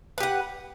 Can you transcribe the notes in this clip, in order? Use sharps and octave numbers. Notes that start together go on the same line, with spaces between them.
G4 B4 F#5